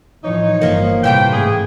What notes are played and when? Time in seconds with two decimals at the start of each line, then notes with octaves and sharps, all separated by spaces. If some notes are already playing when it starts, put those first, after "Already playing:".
0.23 A2 E3 F3 D#4 C#5
0.61 G1 F3 A#3
1.04 A2 C3 E3 G5
1.33 G#2 D3 A3 G#4